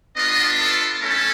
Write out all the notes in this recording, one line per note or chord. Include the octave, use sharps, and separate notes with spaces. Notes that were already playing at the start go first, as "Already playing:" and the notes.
B3 D4 F4 D#5
A4
A3 C#4 E4 A4